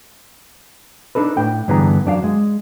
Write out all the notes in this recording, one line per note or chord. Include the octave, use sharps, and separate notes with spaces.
D4 D#4 A4 B4
A2 D4 G5
G2 D3 E3 B3 G#4 A#5
F#2 D4 G4 F5
G#3